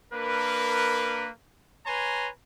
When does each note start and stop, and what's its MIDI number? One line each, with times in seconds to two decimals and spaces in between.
0.13 1.29 58
0.13 1.29 62
0.13 1.29 70
0.13 1.29 71
1.86 2.29 71
1.86 2.29 73
1.86 2.29 80
1.86 2.29 82
1.86 2.29 84